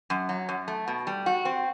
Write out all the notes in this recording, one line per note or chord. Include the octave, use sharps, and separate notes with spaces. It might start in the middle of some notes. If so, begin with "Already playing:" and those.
F#2
F#3
F#2
A3
B2
G3
F#4
C4